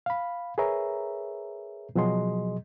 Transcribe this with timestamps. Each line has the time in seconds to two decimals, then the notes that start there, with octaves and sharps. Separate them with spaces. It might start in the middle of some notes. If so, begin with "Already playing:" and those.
0.06 F5 B5
0.58 G#4 A#4 B4 C#5 E5 A#5
1.95 B2 F3 F#3 G#4 D#5 C6